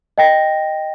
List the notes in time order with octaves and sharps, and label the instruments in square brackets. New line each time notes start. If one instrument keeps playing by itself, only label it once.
[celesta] D#5 G5 A#6